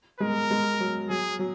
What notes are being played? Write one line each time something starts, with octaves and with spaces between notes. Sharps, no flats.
G#3 A#4
G#3
F#3
F#3 G#4
F#3